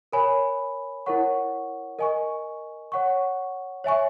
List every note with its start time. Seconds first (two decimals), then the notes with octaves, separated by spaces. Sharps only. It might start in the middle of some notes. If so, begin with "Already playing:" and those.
0.13 A#4 C#5 G#5 B5
1.06 E4 A#4 C#5 F#5 C#6
1.99 A#4 D#5 G#5 C#6
2.92 C#5 F#5 C#6
3.84 C#5 E5 G#5 C#6